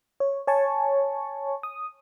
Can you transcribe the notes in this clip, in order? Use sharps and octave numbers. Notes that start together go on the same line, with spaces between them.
C#5
C#5 G#5 A5 C#6
D#6